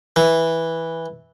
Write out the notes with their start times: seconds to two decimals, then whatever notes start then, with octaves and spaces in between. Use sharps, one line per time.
0.16 E3